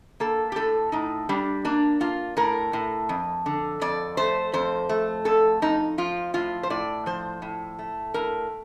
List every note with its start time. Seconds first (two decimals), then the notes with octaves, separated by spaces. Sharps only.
0.20 A#3 A4
0.52 G4
0.56 A2 A4
0.92 A2 D#4
1.29 G3 D4
1.65 A#3 D4
2.01 A#3 F4
2.37 A2 A#4
2.73 A2
3.09 F2
3.46 D3
3.81 F2 D5
4.17 A3 C5
4.53 F2 C5
4.89 A3
5.25 F2 A4
5.62 F2 D#4
5.98 F3 F4
6.34 A2 F4
6.63 C5
6.70 A2 D5
7.06 F3 C5
7.42 A2
7.79 A3
8.14 A2 A#4